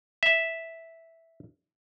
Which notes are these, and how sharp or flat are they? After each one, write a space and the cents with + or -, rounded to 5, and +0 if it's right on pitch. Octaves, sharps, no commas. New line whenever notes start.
E5 -5